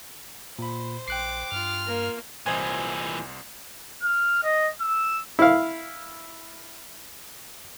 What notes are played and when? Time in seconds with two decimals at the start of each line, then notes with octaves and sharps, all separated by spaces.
0.59 A#2 C5 B5
1.08 A#1 G5 D6 F#6 C7
1.52 G2 F4 F6
1.86 A#3
2.46 C2 A#2 E3 G#4 C5 D#5 G#6
4.02 F6
4.43 D#5
4.80 E6
5.39 E4 F5